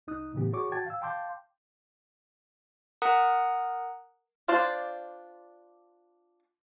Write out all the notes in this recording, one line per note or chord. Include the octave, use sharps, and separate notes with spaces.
C2 D#4 D#6 F#6
A2 C#3 E3 B3 G4
F#4 G#4 C#5 C#6 D6
F#4 G5 A5 G#6 A6
F5 E6
F5 G5 A5 C6 D6 G6
A#4 F#5 A#5 D#6 F#6
D4 F4 C5 D5 F5